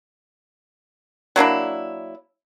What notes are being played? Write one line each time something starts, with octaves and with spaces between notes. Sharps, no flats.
F#3 A#3 D4 E4